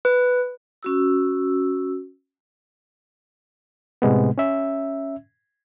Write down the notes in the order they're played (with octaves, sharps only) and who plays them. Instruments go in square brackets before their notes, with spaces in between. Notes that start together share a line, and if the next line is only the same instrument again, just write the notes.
[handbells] B4
[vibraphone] C#4 F#4 E6
[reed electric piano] A2 C3 G#3 B3
C#4 E5